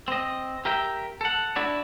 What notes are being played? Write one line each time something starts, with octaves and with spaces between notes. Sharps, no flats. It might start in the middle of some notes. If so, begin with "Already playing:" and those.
C4 D#5
G4 A#4 E5 G5
A4 F#5
D4 E4 F#4 D5